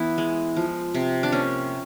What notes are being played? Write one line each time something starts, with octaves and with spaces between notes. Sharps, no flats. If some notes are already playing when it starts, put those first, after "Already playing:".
Already playing: E3 B3 E4
G#3
F3
C3
D4
A#3 C#4